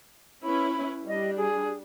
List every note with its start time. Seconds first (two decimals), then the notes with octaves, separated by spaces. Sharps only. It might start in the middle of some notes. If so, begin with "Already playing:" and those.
0.43 C#4 E4 B4 B5
1.07 G3 D4 D#5
1.36 G#4